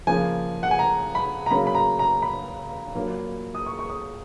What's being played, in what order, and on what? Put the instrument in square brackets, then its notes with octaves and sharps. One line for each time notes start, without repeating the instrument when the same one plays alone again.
[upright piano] C#3 F3 A#3 G#5
F#5
G#5
A#5
B5
A#5
C#3 F#3 A#3 B5
B5
A#5
A#5
B5
A#2 F#3 A#3
D#6
C#6
C#6
D#6